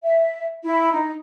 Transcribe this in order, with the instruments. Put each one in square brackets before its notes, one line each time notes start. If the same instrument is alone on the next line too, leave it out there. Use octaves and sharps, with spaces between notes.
[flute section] E5
E4
D#4